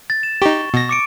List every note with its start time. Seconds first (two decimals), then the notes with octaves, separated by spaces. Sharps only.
0.10 A6
0.23 E7
0.42 D#4 G4 C#6
0.74 B2 A#6
0.89 D6 C#7 D7